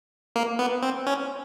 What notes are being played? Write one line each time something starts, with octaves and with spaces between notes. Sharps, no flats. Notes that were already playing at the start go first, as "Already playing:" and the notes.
A#3
B3
C4
C#4